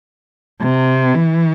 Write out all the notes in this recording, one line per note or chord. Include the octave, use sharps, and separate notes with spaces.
C3
E3